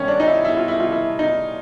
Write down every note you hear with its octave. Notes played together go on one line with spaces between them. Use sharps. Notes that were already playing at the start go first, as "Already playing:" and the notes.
Already playing: G2 D#3 G3 C#4
D4
D#4
E4
E4
F4
E4
F4
E4
D#4